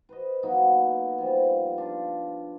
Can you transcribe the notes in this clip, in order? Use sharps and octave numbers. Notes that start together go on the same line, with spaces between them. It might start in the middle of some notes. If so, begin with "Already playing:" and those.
B4 C5 D#5
F#3 A#3 B3 D#4
F3 G3
D4 F4